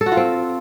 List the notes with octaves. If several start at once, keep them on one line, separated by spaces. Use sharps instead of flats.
A4
F#4
F4
C4